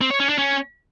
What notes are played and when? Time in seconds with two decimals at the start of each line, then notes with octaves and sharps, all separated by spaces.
0.01 C4
0.11 C#5
0.20 C#4
0.29 D4
0.38 C#4